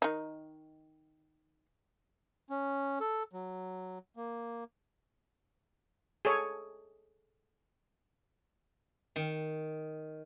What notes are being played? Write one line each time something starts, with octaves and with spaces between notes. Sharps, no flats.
D#3 D#4
C#4
A4
F#3
A#3
G#4 A4 C#5
D#3